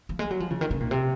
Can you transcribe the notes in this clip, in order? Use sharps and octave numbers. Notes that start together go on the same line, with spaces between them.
F3
G#3
F#3
F3
C#3
D#3
C#3
A#2
C3